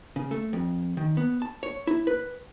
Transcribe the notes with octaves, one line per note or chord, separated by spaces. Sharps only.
C#3
A3
F2
D#3
B3
A5
C#5
E4
B4